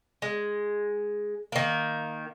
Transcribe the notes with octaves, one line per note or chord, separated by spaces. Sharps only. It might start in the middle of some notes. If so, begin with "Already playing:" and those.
G#3
D#3 A#3